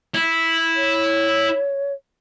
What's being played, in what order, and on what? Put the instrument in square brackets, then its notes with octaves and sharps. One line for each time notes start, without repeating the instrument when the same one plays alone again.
[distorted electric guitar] E4
[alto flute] C#5